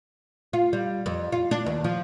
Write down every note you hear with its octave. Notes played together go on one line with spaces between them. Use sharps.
F4
G3
F2
F4
D4
D#2
F3